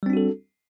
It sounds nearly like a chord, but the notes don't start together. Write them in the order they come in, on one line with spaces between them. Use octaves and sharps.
G3 C4 D4 F#4 A4